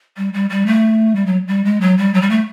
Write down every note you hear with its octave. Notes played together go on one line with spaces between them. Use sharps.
G3
G3
G3
A3
G3
F#3
G3
G#3
F#3
G3
F#3
G3
A3